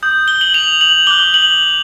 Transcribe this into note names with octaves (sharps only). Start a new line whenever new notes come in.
D#6 G6
G7
F#7
F7
F#7
D6 F#6 G7
F#7